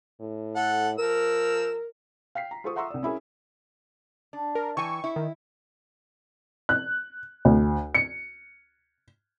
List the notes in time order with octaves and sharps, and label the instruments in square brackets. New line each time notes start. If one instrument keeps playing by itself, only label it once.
[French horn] A2
[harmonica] A4 F#5
[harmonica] F3 E6 [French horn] A#4
[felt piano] F5 G5 B6 C7
A#5
F4 G#4 A4 C5 C#6 D#6
E5 F#5 A#5 C6 C#6 E6
C2 D5
C#4 E4 G#4 A#4
[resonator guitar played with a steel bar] D4
[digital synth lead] A#4
[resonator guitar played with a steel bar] E3 G5 G#5 [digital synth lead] C#6
[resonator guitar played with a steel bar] E4
[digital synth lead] D#3
[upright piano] F#6
D2
C#7